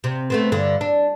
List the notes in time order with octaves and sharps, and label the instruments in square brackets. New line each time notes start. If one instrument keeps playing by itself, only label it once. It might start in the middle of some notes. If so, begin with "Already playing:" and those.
[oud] C3
A3 B3 C4
G2 D3
D4